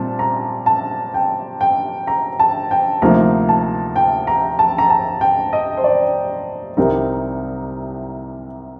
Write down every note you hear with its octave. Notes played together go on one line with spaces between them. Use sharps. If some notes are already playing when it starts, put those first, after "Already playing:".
Already playing: A#2 G3 C4 A5
A#5
A5
G5
G5
A#5
A5
G5
D2 C3 F3 A#3 D#4 A#5
A5
G5
A#5
A5
A#5
A5
G5
D#5
C5
D5
C2 C3 G3 C4 D#4 A#4